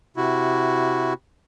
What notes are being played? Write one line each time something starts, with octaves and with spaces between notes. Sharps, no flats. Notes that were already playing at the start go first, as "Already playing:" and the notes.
C3 E4 F#4